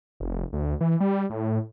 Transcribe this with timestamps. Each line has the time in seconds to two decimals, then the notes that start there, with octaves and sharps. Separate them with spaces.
0.20 F1
0.53 D2
0.81 E3
1.00 G3
1.30 A2